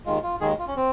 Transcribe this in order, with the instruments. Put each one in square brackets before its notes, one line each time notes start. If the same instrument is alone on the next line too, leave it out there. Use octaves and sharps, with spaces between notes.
[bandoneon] D#2 D#3 G#3 F4
F4
D#2 D#3 G#3 G#4
F4
C#4
C4